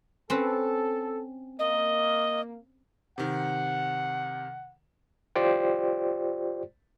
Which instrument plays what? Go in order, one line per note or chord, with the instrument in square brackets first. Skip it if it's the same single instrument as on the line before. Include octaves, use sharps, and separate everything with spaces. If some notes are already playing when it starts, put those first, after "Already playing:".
[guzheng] C4 C#4 B4 [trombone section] A4
[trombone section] A#3 [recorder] D#5
[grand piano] C3 D#3 [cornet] F#5
[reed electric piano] F4 G4 C5 D5 G5